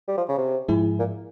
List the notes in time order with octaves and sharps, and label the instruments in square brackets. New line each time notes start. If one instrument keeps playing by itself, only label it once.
[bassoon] G3
F3
C#3
C3
[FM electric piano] G#2 F3 G#3 E4 G#4
[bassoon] A#2